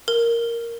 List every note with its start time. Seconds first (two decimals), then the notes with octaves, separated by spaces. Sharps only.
0.08 A#4